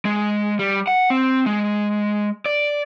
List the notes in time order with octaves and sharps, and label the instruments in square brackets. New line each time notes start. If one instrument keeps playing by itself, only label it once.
[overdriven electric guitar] G#3
G3
F#5
C4
G#3
D5